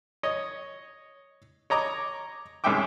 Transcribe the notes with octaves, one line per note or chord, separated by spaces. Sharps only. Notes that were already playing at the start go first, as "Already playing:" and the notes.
C#5 D#5
C#5 D#5 A#5 D6
C2 G#2 C#4 E5 G5 D6